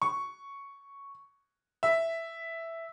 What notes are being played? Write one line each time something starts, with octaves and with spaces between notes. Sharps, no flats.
C#6
E5